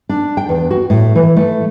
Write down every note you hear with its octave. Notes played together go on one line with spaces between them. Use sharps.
D4
G5
E2
F#4
A2
E3
A3